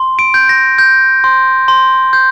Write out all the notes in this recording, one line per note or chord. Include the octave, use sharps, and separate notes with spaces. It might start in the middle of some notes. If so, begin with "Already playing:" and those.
Already playing: C6
D7
G6
A#6
G6
C6
C6
G6